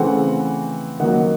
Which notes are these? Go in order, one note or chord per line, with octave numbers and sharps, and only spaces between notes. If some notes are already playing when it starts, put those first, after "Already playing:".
Already playing: C#3 E3 A3 C4 F#5
D#3 F#3 A#3 F#5